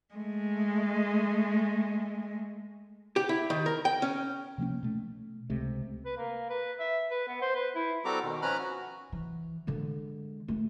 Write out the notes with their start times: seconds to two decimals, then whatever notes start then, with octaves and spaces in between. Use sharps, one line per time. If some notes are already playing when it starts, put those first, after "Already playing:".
0.15 G#3 A3
3.16 G4
3.29 E4
3.50 D#3
3.66 A#4
3.85 G5
4.02 C#4
4.58 C3 F3 A#3 C#4
4.83 B2 A3
5.50 C#2 C3 G#3 A3
6.05 B4
6.17 A#3
6.50 B4
6.80 E5
7.11 B4
7.28 B3
7.42 C5
7.55 B4
7.75 E4
8.05 G3 C4 F#4 A4 A#5 D6
8.23 B2 D#3
8.42 F3 C#4 B4 A#5 B5 F6
8.58 F#4
9.12 E3
9.67 D3 G#3
10.48 A3